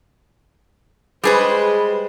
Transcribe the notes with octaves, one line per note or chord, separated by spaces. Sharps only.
G3 G#3 G#4 B4 C5